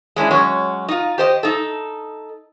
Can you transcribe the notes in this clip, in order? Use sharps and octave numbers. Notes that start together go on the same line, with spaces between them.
G#3 C#4 D4 E4
F#3 G#3 C#4 C#5
D#4 F4
G4 C5 D#5
D#4 A4